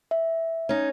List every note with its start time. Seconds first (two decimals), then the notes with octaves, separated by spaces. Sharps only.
0.11 E5
0.69 C#4 D#4